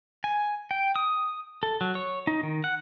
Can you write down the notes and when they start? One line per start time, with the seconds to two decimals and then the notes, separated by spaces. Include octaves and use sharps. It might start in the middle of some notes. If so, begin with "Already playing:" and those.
0.24 G#5
0.71 G5
0.96 D#6
1.63 A4
1.81 F#3
1.95 C#5
2.27 D#4
2.43 D#3
2.64 F#5